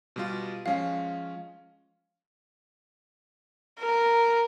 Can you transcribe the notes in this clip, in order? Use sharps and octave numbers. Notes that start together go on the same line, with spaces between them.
B2 G3 F4
F3 G#3 C#4 F5
A#4